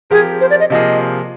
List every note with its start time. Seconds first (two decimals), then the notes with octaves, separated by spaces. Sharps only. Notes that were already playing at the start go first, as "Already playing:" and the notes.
0.11 F3 C4 G4 G#4 A#4
0.41 C5
0.50 D5
0.60 D#5
0.70 C3 F3 A#3 F4 G#4 D#5